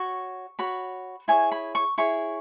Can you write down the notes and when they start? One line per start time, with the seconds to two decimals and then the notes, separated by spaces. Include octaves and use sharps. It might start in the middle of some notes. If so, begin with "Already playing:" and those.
Already playing: F#4 C#5 C#6
0.59 F#4 C#5 B5
1.28 E4 G#4 C#5 G#5
1.52 B5
1.75 C#6
1.98 E4 G#4 C#5 C#6